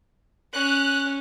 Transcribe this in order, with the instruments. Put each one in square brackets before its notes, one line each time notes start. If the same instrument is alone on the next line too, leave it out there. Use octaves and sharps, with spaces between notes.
[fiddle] C#4 [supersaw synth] F#6